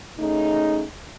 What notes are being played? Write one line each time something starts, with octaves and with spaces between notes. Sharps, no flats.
C#3 A3 D#4